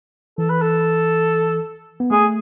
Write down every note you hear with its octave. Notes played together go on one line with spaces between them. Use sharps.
E3 A4
B4
A4
B3
A3 G#4